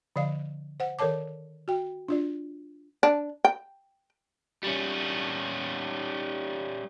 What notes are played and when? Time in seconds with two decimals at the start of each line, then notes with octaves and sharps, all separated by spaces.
0.16 D3 F3 D5 F5
0.80 C5 F#5
0.99 D#3 A4 A#4 C#5 A5 D6
1.68 F#4 G5
2.08 D4 F4 D5
3.03 D4
3.44 G5
4.64 G3 C#4